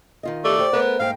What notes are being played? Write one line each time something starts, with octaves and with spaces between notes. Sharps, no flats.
D#3 F4 D#5
A3 G4 D5
G4 C5
A3 B3 A#4
G#2 A#3 F5 G5